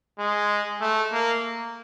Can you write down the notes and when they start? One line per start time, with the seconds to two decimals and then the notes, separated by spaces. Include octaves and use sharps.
0.19 G#3
0.81 A3
1.12 A#3